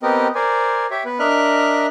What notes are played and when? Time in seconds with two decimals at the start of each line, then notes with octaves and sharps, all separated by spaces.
0.03 B3 C4 G4 A#4 D#5
0.35 A#4 C5 D5 G#5
0.91 G4 C#5 E5
1.05 B3 B4
1.19 D4 A#4 D#5 E5 F6 F#6